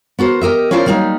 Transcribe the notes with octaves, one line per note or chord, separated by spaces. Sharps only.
B3 F#4 A#4 C5
G4 A#4 D#5 E5
C#4 E4 F4 A#4 C5 D5
F#3 G3 A#3 C4 D#4